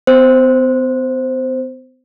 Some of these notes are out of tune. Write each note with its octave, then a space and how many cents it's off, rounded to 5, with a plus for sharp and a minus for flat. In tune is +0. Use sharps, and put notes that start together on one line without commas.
B3 +45 C5 +0